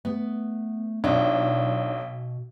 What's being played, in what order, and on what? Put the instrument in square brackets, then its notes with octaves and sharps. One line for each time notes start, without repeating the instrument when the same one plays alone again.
[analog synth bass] A3 [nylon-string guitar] B3
[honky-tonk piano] B1 [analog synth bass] B2 [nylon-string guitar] D4 D#4 F4